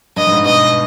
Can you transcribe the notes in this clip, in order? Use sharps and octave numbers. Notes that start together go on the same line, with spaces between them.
G2 D#5
G2
G#2
B2 D#5